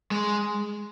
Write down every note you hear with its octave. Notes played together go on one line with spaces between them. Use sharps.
G#3